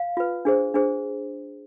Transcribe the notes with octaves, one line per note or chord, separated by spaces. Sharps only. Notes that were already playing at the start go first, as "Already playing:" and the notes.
Already playing: F5
F4 B4
D4 G#4 C5
D4 G#4 C5